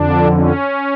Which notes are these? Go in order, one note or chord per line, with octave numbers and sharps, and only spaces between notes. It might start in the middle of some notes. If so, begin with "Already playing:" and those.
Already playing: F2 D3 D4
C#4